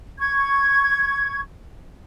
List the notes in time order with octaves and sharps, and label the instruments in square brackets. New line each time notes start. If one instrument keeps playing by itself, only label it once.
[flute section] C#6 G#6